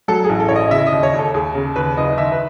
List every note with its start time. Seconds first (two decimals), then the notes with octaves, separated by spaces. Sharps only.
0.08 F#3 A4
0.24 G#4
0.29 A1
0.40 A4
0.48 A1 C#5
0.56 D#5
0.71 C#3 E5
0.87 D#5
0.92 D#2
1.03 C#5
1.14 D#2 A4
1.34 D#2 G#4
1.55 C#3
1.76 D#2 B4
1.97 F#1 D#5
2.18 D#3 E5
2.32 B4